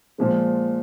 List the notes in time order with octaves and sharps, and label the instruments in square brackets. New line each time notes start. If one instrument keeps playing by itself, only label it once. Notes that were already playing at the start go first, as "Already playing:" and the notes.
[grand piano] A#2 F3 G#3